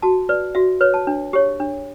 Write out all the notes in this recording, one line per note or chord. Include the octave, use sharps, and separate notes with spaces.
F#4 A5
B4 D5
F#4 E5
B4 C#5
A5
D4
G4 C#5
D4